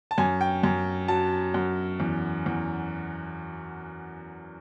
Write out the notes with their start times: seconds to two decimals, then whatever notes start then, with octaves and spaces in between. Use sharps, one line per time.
0.11 A5
0.18 F#2 G#5
0.41 G5
0.63 F#2
1.08 F#3 A5
1.54 F#2
2.00 E2
2.46 E2